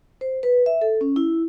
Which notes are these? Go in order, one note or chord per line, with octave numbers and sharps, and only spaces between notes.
C5
B4
E5
A4
C#4
E4